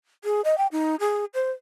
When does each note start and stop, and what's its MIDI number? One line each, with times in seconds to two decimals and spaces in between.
0.24 0.41 68
0.45 0.57 75
0.58 0.67 79
0.72 0.95 63
1.00 1.25 68
1.34 1.51 72